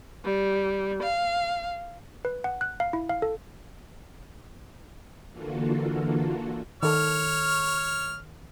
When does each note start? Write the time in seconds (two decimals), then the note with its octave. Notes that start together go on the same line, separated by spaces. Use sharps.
0.25 G3
1.02 F5
2.25 B4
2.44 F#5
2.61 F#6
2.80 F5
2.93 E4
3.09 F5
3.22 A4
5.30 D3 E3 A#3 F4 F#4 A4
6.83 D#3 A4 C#5 F6